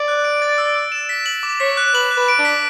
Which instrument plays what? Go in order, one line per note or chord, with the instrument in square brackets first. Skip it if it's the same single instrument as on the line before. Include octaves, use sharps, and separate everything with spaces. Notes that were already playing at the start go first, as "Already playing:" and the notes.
Already playing: [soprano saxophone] D5
[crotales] F#6
D7
A6
E6
E6
E7
B6
F#7
D6
[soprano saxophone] C#5 [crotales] B6
[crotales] F#6
[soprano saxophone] B4 [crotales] F#7
[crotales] F#6
[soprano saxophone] B4
[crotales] D7
[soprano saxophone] D4
[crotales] B6